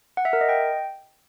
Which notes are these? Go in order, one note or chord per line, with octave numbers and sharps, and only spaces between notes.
F#5
E5
A#4
D#5
G5